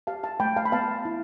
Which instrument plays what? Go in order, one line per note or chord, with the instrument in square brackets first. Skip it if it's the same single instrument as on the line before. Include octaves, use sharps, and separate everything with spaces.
[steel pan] G4 F5 A5
F5 A5
A3 G5 B5
F5 A5
B5
B3 F5 A5
E4